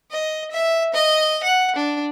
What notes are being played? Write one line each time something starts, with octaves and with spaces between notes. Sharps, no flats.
D#5
E5
D#5
F#5
D4